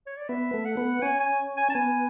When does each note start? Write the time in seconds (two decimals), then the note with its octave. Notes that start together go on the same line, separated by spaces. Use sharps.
0.07 C#5
0.17 D5
0.29 B3 E5
0.54 A3
0.65 F#5
0.77 B3
1.02 C#4 G#5
1.20 G#5
1.57 G#5
1.70 A5
1.75 B3 G#5